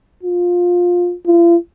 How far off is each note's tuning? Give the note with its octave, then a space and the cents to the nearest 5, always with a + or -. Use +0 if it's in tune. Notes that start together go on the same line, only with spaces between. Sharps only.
F4 +15
F4 -40